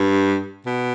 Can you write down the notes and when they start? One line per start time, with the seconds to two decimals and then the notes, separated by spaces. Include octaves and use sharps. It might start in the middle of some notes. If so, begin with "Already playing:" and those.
Already playing: G2
0.66 B2